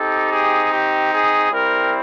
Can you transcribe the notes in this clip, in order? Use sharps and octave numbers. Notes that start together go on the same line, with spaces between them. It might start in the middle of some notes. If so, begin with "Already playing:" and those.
Already playing: C4 D#4 G4 A4
G#4
G4
G#4
G3 C4 E4 A#4